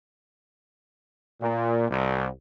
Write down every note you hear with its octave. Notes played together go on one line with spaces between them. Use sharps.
A#2
C2